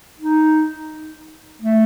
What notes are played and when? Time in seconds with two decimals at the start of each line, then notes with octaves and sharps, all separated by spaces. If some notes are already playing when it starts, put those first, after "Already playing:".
0.19 D#4
1.62 A3